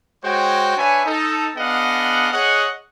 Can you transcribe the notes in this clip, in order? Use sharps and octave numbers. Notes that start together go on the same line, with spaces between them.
G#3 F#4 C5 C#5 G5
D4 B4 C#5 E5 G#5
D#4 A4
B3 D4 G#4 D#5 F5 F#5
G#4 C#5 D#5 F#5